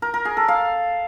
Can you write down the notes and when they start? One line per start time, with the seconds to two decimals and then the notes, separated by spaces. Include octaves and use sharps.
0.02 A#4
0.14 A#4
0.25 G#4
0.37 A4
0.48 F5